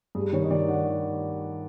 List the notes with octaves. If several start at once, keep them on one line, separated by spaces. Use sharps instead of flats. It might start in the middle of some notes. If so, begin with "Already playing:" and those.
G2 G#4
D#3 C#5
D#5
D#3 D5
F#5